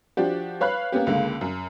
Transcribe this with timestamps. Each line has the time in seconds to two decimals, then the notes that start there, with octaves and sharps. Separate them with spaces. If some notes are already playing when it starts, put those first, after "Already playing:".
0.17 F3 D4 F#4 G4
0.61 B4 C#5 F5 B5 F#6
0.92 A#3 B3 C#4 G4
1.07 C#2 D3 G#3 A#3
1.41 F#2